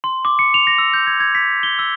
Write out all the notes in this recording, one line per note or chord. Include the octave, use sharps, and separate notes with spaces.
C6
D6
C#7
F7
A#6
E6
G6
G#6
G#6
B6
G7
E6